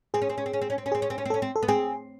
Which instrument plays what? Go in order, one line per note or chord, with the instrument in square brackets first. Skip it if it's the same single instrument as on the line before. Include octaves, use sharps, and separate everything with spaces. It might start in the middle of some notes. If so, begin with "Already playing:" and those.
[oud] C4 [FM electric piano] G#4
[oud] C#4
C4
C#4
C4
C#4
C4
C#4
C4
C#4
[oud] C4 [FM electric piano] G#4
[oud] C#4
C4
C#4
C4
[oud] C#4 [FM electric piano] A4
[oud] C4
[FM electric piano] A4
[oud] B3
[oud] C4 [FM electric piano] G#4